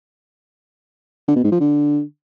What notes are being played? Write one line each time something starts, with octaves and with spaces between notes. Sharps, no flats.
D3
B2
G#2
F3
D3